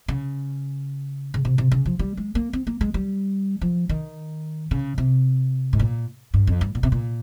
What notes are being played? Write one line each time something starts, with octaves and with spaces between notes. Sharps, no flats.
C#3
C#3
C3
C3
C#3
F3
G3
G#3
A#3
C4
A#3
G#3
G3
F3
D#3
C#3
C3
G#2
A#2
G2
F2
G2
A#2
C3
A#2